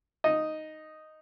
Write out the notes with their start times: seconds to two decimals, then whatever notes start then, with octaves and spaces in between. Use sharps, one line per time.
0.24 D#4 D#5